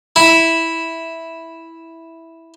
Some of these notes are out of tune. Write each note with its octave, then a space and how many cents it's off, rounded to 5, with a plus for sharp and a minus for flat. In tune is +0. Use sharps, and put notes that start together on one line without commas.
E4 -5